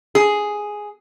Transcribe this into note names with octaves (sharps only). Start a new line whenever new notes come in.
G#4